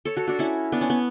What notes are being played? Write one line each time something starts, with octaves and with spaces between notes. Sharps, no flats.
A4 C#5
F#4 A4
D4 F#4
C#4 E4
B3 D4
C#4
B3